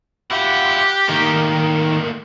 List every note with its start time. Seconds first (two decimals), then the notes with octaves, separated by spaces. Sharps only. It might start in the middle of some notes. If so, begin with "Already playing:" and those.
0.31 E4 F4 G4 F#5
1.09 A2 D#3 A#3 A#4